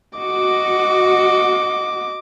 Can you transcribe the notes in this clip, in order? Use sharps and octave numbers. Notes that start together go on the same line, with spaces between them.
F#4 D#5 D6